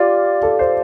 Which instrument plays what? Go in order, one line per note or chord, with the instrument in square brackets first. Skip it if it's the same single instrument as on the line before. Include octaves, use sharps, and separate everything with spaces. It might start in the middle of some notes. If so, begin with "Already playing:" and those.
Already playing: [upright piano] F4 [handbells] G4 D5 F5
[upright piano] A4
C5